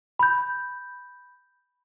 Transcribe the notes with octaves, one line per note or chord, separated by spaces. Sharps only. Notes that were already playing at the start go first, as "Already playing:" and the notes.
B5 G6